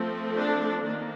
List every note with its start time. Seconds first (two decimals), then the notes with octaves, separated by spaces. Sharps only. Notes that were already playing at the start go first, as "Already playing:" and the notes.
Already playing: F3 A3 C4
0.36 D4
0.84 D#3 A#3 D4